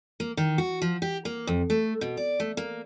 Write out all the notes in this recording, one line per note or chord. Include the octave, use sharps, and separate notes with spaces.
A#3
D#3
F#4
F3
G4
A#3
F2
A3
B2
D5
A3
A#3